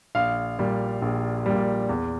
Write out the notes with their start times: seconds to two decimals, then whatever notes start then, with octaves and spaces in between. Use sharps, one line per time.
0.15 A#1 F5
0.59 A#2 G3
1.02 A#1
1.46 A#2 G3
1.89 E2